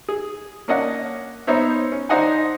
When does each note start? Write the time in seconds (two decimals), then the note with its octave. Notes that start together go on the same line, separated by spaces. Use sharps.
0.09 G#4
0.68 A#3 C#4 D4 D#5 F#5
1.47 B3 D#4 C5 C#5 E5
1.92 C#4
2.09 D4 D#4 C5 D#5 F#5 G#5